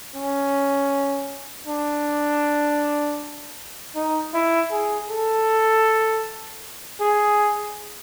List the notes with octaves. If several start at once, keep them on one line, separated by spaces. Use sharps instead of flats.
C#4
D4
D#4
E4
G#4
A4
G#4